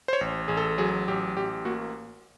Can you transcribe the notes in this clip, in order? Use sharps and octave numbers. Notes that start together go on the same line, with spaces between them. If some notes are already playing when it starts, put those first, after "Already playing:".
C5
C#5
A1
A1 G#4
A4
F#3 G#4
A1 G4
A1 G4
A#3 F#4